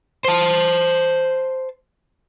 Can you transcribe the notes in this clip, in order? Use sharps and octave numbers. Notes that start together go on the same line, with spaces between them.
C5 A5